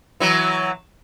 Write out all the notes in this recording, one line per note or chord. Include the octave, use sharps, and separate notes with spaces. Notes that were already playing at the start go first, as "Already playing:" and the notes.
E3 F#3